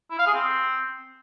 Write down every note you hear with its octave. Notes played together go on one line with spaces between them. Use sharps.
E4
F5
G#4
C4